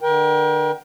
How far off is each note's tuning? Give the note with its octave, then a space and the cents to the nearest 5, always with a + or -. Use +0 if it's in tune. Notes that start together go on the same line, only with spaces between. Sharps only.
D3 +30 A#4 +40 G5 +0